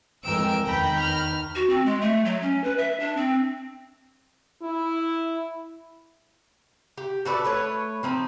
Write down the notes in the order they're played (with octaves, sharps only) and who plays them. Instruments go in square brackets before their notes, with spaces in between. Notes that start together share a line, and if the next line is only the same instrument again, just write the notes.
[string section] F2 G5 E6 [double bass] E3 G#3 [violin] A#4 D7
[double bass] E2 D#3 [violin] G5 [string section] A#5 B5 G6
[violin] F6
[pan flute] F#4
C4
G#3
A3
F#3
C#4
B4
E5
D4
C4
[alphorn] E4
[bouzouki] G4
F#4 A4 B4 D5
A3 B4 C#5
F3 C4 D#4